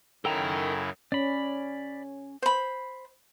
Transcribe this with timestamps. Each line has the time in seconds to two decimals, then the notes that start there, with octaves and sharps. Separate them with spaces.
0.25 F#2 C#3 D#4 E4 A4 A#4 G5 A#5
1.12 C#4 D5 B5
2.42 C5 B5